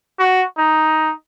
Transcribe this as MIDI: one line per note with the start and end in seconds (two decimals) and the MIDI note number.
0.19 0.43 66
0.58 1.13 63